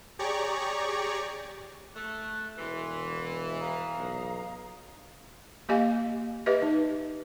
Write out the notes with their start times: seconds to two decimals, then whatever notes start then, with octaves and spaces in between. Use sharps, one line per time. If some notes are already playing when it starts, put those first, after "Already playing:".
0.19 G4 G#4 C#5 D5 A#5 C#6
1.95 A3 F#6
2.58 E1 E3 C6
3.60 F5 A#5 D#6
3.97 B1
5.69 A#3 G4 D#5 F5 G#5
6.46 G4 B4 D#5 E5
6.62 D#4